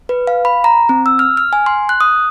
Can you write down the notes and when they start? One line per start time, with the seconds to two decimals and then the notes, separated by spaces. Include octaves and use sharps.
0.09 B4
0.27 F5
0.45 B5
0.64 A#5
0.89 C4
1.06 E6
1.19 F6
1.37 F6
1.53 G#5
1.66 C6
1.89 F#6
2.00 D#6